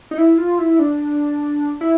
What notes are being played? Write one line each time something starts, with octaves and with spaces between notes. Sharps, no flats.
D#4
E4
F4
E4
D4
E4